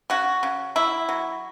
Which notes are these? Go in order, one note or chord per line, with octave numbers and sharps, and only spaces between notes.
C#3 F#4
C#3
F#3 E4
F#3